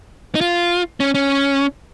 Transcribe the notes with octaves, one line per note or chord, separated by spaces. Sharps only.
D#4
F4
C#4
C#4